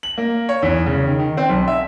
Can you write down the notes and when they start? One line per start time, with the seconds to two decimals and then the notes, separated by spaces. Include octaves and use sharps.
0.03 F#7
0.18 A#3
0.49 C#5
0.62 E2
0.86 C#3
1.07 D#3
1.19 D#3
1.37 C4
1.49 B1
1.68 E5